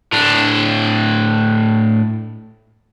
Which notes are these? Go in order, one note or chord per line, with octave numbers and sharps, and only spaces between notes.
A2 D4